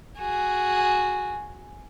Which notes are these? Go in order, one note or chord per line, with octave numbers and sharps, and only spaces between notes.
F#4 G#4